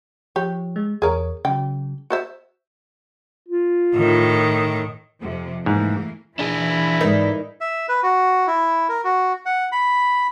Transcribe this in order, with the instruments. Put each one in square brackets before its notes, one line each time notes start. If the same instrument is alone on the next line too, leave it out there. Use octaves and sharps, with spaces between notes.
[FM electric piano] F3 [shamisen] G4 C#5
[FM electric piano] G#3
[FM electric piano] E2 C#5 [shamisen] G#4 A#4
[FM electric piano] C#3 F#3 [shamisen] G5
[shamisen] F#4 C5 E5
[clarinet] F4
[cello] A2 D#3
[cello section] F2 C3
[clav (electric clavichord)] G#2 [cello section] E3 A3 A#3
[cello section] E3 E4 [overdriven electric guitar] D4 G#4
[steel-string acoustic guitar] G#2 D5 [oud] D#4 A#4 B4
[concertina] E5
B4
F#4
E4
A#4
F#4
F#5
B5